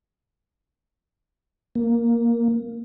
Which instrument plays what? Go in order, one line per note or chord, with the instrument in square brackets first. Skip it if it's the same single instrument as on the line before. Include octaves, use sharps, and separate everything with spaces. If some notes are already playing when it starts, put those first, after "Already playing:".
[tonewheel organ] A#3